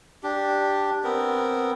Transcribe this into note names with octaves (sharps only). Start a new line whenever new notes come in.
D4 G4
B3 C4 A#4